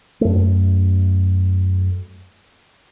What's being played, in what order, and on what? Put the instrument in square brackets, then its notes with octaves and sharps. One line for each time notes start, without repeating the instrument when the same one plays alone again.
[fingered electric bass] F#2 A3